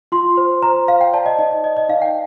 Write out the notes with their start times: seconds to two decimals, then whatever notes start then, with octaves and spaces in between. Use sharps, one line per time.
0.12 F4 C6
0.37 C5
0.62 C5 A#5
0.88 C5 F5
1.01 G5
1.13 D5 A5
1.26 D#5
1.39 D#4 D#5
1.51 D#5
1.64 D5 D#5
1.77 D#5
1.89 D#4 F5
2.02 G5